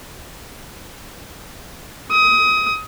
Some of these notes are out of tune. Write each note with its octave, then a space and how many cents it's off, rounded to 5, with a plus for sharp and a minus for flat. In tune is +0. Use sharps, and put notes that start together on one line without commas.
D#6 +25